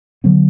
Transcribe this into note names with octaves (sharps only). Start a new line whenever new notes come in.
D3 F#3 B3